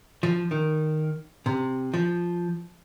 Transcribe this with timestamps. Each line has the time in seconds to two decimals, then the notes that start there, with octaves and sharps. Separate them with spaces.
0.23 F3
0.51 D#3
1.46 C3
1.94 F3